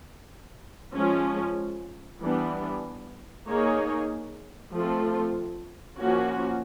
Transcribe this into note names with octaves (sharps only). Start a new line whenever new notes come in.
F3 G#3 C#4
E3 G3 B3 D4
A#3 D#4 G#4 C#5
F3 A3 C4 F4 A4
F3 A#3 C#4 F#4